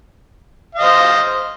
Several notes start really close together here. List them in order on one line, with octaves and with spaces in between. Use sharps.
F5 D#5 C5